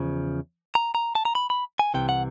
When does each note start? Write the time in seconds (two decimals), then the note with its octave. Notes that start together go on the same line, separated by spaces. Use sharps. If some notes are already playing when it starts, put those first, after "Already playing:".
Already playing: E2 C#3 F3
0.75 A#5
0.95 A#5
1.15 A5
1.25 A#5
1.35 B5
1.50 B5
1.79 G#5
1.94 C2 C3 E3 G5
2.09 F#5